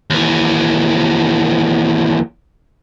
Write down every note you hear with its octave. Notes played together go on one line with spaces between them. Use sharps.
D#2 E3